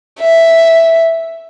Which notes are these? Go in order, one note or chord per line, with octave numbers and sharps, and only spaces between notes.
E5